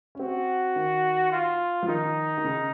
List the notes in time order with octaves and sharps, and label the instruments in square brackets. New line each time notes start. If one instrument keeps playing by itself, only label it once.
[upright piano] C#4
[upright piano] C4 [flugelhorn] F#4
[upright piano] D#3
[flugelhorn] F4
[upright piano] F3
[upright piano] D#3 [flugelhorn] D#4
[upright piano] D#3
C#3